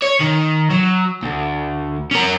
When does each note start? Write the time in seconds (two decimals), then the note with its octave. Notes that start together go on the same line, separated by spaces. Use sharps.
0.02 C#5
0.20 D#3
0.70 F#3
1.23 D2
2.11 C#4 A#4